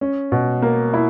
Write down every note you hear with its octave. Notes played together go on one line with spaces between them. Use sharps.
C#4
B2
A#3
E4